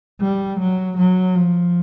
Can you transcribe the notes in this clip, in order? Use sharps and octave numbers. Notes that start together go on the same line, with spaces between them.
G3
F#3
F#3
F3